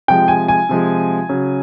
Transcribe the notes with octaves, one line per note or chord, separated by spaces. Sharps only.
C3 F3 G#3 G5
G#5
G#5
C3 F3 G#3
C#3 F#3